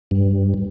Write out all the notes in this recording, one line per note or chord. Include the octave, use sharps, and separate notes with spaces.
G2